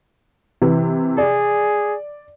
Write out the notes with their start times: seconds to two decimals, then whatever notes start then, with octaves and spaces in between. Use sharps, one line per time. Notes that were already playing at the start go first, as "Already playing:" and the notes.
0.62 C3 E3
1.18 G#4 D5